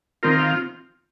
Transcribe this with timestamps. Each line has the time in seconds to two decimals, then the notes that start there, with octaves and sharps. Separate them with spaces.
0.23 D#3 C4 F4 A#4
0.39 F5